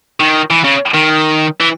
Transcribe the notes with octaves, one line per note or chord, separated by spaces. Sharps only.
D#3
E3
C#3
D#3
E3